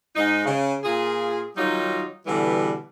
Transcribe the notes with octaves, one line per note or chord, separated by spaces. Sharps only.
G#2 D#4
C#3
A#2 F4 G#4
D#3 F#3 G3 D#4 F4
B2 D3 E3 G3